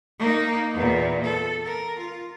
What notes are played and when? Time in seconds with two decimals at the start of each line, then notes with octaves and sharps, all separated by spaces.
0.19 A#3 D#4
0.74 E2 A#2
1.24 A4
1.65 A#4
1.99 F4